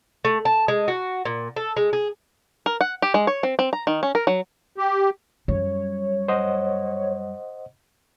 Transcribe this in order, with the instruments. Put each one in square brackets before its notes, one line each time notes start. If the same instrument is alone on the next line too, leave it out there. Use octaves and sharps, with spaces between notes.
[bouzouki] A3
A5
G#3
F#4
A#2
A4
G#3
G#4
[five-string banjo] A#4
F#5
G4
G#3
C#5
C4
C4
A#5
D#3
C#4
A#4
F#3
[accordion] G4
[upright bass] F#2 G3 [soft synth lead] C#5
[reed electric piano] C5 D#5 F#5